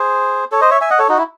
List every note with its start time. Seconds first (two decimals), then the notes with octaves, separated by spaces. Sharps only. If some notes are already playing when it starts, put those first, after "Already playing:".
Already playing: G#4 C5
0.52 A4 C#5
0.61 C5 D#5
0.70 C#5 E5
0.81 E5 G#5
0.90 D#5 F#5
0.99 A4 C#5
1.09 D#4 F#4
1.18 E4